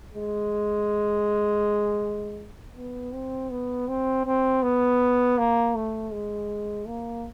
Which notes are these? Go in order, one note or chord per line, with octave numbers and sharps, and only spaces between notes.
G#3
B3
C4
B3
C4
C4
B3
A#3
A3
G#3
A#3